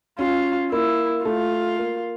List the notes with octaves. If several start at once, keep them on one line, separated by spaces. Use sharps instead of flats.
C#4 F4
A#3 E4
A3 F4
A#3